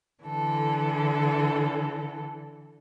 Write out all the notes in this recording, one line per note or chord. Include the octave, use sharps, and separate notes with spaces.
D3 E3 A4